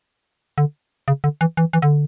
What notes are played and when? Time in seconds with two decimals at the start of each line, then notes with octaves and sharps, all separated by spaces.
0.58 D3
1.08 C#3
1.24 D3
1.41 E3
1.57 E3
1.73 E3
1.82 D3